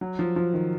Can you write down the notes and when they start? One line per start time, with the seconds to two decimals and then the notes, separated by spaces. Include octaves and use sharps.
0.01 F#3
0.19 F3
0.36 F3
0.54 D#3